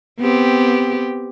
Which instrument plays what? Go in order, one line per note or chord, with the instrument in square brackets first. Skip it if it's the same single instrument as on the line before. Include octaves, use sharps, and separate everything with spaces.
[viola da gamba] B3 C4 G4